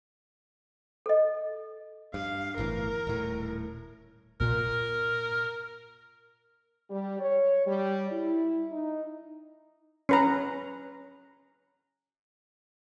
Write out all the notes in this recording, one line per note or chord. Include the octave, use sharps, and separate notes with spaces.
A4 D#5
G2 F5
G1 A2 E3 A#4
D#1 A2
A#2 A#4
G3
C#5
G3
E4
D#4
C#4 B4 A#5